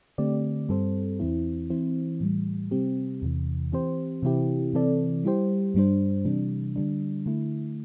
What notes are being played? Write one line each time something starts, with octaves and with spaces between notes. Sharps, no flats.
D3 A3 C4 G4 D5
G2 G3 C4 A4 C5
E2 E3 C4 E4
E3 C4 E4 C5
A2 E3 G3
C3 G3 C4 G4
E2 C3 E3
E3 C4 G4 C5
C3 E3 C4 E4 G4
C3 E3 C4 A4 D5
G3 E4 G4 C5
G2 G3 D4 C5
C3 E3 G3 D4
D3 G3 D4
D3 A3 E4